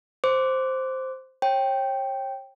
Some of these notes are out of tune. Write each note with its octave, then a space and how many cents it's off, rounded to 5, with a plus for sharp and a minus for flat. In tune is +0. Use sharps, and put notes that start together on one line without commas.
C5 +0 D6 -10
C#5 -35 G5 +0